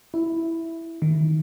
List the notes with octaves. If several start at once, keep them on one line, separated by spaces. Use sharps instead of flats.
E4
D#3